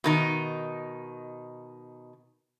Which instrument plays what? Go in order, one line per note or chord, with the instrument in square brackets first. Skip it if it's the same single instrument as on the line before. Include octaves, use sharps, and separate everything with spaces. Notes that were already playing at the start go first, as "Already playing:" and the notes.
[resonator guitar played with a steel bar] B2 D#3 D#4